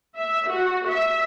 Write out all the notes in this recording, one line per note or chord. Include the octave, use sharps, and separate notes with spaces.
E5
F#4
E5